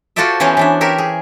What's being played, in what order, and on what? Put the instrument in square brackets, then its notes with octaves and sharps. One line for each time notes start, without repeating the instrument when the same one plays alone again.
[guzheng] F4 F#4 A4 C5 D5 E5
E3 B3 C#4 C5 C#5
E3 D4 E5
G4 A#4 C#5 E5
G#4